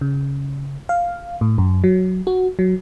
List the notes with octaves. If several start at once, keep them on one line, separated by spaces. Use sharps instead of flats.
C#3
F5
A2
F#2
F#3
F#4
F#3